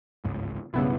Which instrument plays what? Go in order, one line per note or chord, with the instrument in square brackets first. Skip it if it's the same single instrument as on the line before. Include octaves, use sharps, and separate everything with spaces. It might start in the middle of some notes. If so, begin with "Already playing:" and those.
[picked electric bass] G1 C#2 G#2
[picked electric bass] B1 G2 [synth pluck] C#3 B3 E4